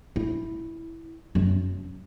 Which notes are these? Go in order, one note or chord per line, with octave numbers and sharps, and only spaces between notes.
E4
F#2